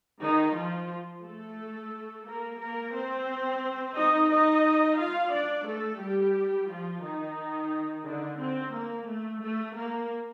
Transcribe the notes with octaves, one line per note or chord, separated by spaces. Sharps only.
D#3 D#4
F3 F4
A3 A4
A#3 A#4
A#3 A#4
C4 C5
D#4 D#5
D#4 D#5
F4 F5
D4 D5
A3 A4
G3 G4
F3 F4
D#3 D#4
D3 D4
C4
A#3
A3
A3
A#3